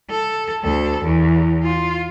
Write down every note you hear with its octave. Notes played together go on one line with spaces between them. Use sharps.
A4
D2 A4
E2
F4